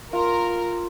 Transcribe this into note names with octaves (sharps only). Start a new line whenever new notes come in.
F4 A#4